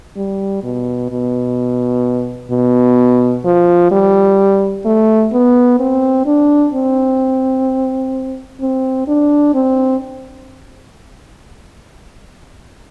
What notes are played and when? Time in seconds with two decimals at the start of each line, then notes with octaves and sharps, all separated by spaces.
0.16 G3
0.63 B2
1.10 B2
2.51 B2
3.45 F3
3.91 G3
4.85 A3
5.33 B3
5.80 C4
6.26 D4
6.74 C4
8.61 C4
9.08 D4
9.54 C4